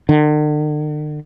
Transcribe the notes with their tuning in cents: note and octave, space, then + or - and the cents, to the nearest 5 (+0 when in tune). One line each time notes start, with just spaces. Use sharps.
D3 +45